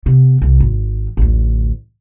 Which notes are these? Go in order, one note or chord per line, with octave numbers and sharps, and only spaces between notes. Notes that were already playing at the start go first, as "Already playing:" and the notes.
C3 B3
C2
G#1
A1 D2